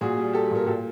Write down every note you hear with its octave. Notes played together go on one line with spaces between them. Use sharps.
A#2 F#4 G#4
G3
G3 G4 A4
A#2 A#4
A#2 G4 A4